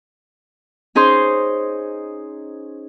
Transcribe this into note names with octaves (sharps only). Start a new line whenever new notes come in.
C#4 D#4 G#4 C5 C6